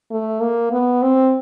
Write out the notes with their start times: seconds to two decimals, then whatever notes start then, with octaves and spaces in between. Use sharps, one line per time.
0.11 A3
0.41 A#3
0.72 B3
1.03 C4